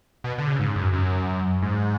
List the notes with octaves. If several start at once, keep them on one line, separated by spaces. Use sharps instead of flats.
B2
D3
C#3
G#2
F#2
F#2
G#2